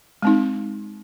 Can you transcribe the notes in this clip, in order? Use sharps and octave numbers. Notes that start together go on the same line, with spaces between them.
G#3 C4 D#4